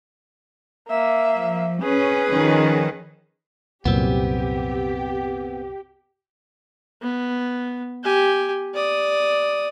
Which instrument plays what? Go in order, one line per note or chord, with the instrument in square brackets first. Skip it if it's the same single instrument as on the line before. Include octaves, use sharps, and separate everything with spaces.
[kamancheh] A#3 E5
[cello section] F3
[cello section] C#4 [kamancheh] G#4 B4
[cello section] D#3 F3 C#4
[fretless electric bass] C2 F#2 A#2 [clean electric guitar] B3 C4 [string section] G4
[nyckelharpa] B3
G4 G#5
D5 D#6